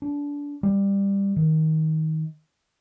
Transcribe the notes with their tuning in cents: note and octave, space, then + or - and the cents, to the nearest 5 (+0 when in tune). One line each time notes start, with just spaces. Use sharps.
D4 -25
G3 +15
D#3 +20